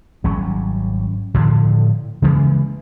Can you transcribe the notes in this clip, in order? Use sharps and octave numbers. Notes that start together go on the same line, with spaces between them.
G#1 F#3 G3 C#4
A2 D3 F3
C#3 E3 G#3 A#3